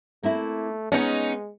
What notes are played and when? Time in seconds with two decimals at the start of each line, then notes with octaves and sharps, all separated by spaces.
0.23 A3 A#3 C4 E4
0.92 G#3 B3 C#4 D#4 D#5